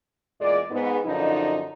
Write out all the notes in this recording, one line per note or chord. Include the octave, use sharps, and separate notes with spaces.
E2 A#2 G#3 D5
G#2 B3
F#2 D3 F3 D#4